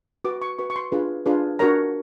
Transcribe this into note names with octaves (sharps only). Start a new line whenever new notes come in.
F#4 B4 D6
C#6
F#4 B4 C#6
C#6
C6
D4 F4 G#4 B4
D4 F4 G#4 B4
D4 F#4 A#4 C#5 A#5